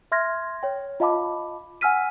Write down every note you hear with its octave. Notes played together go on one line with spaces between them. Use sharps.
E5 C6 F6 G#6 A#6
C#5 G5
F4 D#5 F5 A5 B5 D6
F#5 G#5 E6 F6 B6 D#7